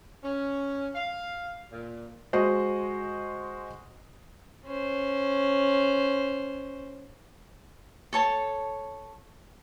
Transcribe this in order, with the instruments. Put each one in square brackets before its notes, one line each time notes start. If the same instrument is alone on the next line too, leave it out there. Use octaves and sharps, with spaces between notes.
[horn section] C#4
F5
A#2
[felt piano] G#3 F#4 C5 D#5
[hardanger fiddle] C#4 C5
[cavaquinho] A4 C#5 A5